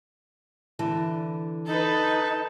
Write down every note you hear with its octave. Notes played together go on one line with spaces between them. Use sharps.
D3 E3 A5
D#4 A4 B4